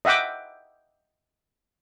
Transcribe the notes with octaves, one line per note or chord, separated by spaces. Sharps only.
D#5 E5 F#5 G5 D6